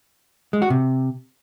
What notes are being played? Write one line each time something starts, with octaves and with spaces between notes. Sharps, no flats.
G#3
F#4
C3